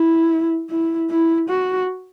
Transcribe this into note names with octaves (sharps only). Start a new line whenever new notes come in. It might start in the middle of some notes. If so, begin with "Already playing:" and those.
Already playing: E4
E4
E4
F#4